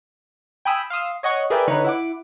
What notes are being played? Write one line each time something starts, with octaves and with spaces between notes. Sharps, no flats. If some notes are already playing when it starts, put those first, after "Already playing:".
G5 G#5 B5 D#6 E6
F5 C6 D#6 E6
C#5 D#5 F#5 C#6
G#4 A#4 B4 D5 E5 G5
D3 D#4 B4 C#5
E4 F#5 D6